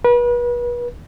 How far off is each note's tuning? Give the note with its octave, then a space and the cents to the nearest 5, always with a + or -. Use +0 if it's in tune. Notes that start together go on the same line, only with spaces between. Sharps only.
B4 -35